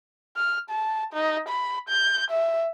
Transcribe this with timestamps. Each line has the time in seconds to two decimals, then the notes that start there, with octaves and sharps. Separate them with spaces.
0.36 F6
0.70 A5
1.13 D#4
1.48 B5
1.89 G6
2.31 E5